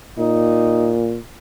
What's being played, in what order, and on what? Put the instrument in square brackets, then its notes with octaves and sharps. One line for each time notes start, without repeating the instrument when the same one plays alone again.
[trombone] A#2 [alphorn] D#4